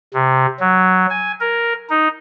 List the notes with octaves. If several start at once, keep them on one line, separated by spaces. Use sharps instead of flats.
C3
F#3
G#5
A#4
D#4